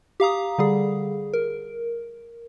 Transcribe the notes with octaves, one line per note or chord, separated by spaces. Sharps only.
G4 F5 A#5 D#6
D3 G3 G#4
A#4